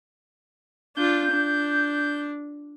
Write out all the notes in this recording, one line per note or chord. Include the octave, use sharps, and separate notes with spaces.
D4 F4 G6
D4